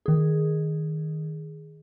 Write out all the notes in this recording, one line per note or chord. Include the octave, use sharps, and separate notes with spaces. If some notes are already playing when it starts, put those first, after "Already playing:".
D#3 G#4